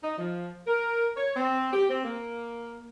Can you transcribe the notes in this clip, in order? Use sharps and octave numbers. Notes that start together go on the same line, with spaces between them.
D#4
F3
A#4
C#5
C4
G4
C4
A#3